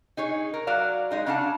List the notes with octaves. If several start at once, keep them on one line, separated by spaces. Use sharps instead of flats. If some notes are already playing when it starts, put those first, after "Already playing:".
D#4 G#4 C#5
A#4
F#3 F#4 D5 F5
G#3 D#4 G#4
C#3 C#4 D4 F5 F#5 A5